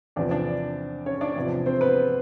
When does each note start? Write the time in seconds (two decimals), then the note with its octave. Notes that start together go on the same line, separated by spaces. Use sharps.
0.16 E2 C3 F3 D4 D5
0.31 D4 D5
1.06 C#4 C#5
1.21 D4 D5
1.36 E2 C3 F3
1.66 C4 C5
1.81 B3 B4